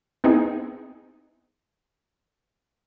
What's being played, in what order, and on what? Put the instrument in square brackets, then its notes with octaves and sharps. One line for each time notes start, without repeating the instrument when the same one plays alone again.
[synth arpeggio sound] B3 C4 D#4 E4 G#4